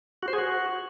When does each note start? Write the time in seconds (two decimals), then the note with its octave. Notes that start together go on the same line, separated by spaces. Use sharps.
0.23 F#4
0.28 C5
0.33 G#4
0.38 F#4